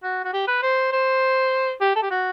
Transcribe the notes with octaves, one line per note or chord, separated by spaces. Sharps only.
F#4
F#4
G4
B4
C5
C5
G4
A4
G4
F#4